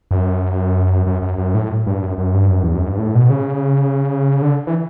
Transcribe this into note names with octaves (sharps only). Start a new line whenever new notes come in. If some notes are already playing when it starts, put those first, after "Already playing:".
F#2
F#2
F#2
F#2
A2
G2
F#2
F#2
G2
F#2
E2
F#2
G2
A2
B2
C#3
D3
E3